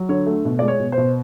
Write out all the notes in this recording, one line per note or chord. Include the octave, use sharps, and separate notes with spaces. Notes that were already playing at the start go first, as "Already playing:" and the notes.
Already playing: F#3
D3 C#5
A3
B2
G#3 D5
C#5
B2
C5
B2